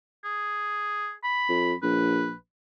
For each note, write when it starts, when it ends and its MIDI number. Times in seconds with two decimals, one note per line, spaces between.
0.24 1.13 68
1.24 1.74 83
1.49 1.74 41
1.82 2.33 34
1.82 2.35 71